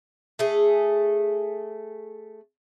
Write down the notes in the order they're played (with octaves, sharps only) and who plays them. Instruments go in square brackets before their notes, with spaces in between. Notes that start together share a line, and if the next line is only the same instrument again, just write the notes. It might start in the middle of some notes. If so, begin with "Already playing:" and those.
[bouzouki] A3 G#4